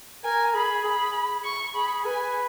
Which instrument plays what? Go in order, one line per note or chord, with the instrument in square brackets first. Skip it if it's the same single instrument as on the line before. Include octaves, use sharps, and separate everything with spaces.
[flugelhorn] A#4 [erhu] G#5
[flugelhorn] G#4 [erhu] B5
[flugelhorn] G#4 [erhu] B5
[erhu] C#6
[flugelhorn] G#4 [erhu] B5
[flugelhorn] B4 [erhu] G#5